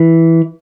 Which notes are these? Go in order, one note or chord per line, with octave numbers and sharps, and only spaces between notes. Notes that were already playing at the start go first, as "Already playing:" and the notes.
Already playing: E3